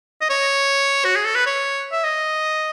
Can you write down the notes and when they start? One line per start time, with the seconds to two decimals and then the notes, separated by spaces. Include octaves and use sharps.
0.21 D#5
0.29 C#5
1.05 F#4
1.16 G#4
1.25 A4
1.35 B4
1.46 C#5
1.92 E5
2.04 D#5